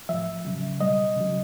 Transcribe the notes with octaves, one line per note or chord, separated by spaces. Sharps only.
A2 F3 E5
C#3 F#3
B2 G3 D#5
C#3 F#3